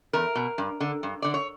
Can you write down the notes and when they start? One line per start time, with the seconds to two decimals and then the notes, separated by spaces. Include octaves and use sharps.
0.13 E2 A#4
0.35 B2
0.58 G2
0.80 D3
1.03 G2
1.22 D3 D5
1.34 C#5